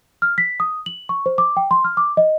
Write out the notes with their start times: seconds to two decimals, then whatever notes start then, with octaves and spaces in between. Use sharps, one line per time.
0.22 F6
0.38 B6
0.60 D#6
0.86 F#7
1.09 C#6
1.26 C5
1.38 D6
1.57 G5
1.71 C6
1.84 F6
1.97 D6
2.17 D#5